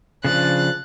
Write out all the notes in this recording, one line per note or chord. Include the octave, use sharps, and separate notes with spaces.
C#3 F3 D4 F#6 A6